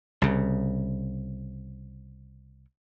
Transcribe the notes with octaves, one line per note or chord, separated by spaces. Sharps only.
C2 C#3